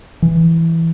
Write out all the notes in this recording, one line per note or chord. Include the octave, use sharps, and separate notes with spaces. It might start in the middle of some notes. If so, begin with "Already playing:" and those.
E3